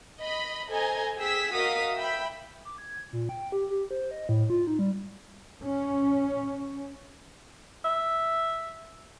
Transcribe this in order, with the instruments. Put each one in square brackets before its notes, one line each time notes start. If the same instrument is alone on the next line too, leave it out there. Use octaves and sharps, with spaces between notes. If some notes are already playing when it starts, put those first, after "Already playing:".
[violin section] D#5 B5
A4 C5 D#5 G#5 A#5
G#4 G5 E6 B6
F#4 A#4 D#5 F5 D#6 B6
E5 G5 B5
[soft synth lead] D6
G#6
A#2
G5
G4
G4
C5
D#5
A2
F4
D#4
G3
[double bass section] C#4
[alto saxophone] E5